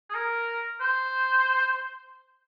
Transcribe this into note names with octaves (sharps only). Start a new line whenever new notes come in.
G#4
A#4
C5